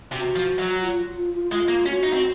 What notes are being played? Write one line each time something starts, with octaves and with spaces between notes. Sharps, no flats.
C3 F#4
F3
F#3
F4
F4
F4
G#3 F4
A#3
C#4 F#4
D#4
C4